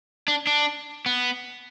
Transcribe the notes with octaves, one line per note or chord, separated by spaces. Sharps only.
D4
D4
B3